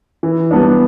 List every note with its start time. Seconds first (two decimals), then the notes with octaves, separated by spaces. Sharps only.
0.23 E3
0.51 G3 B3 D4